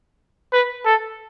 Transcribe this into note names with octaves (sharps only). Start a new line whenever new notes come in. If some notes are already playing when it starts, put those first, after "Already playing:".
B4
A4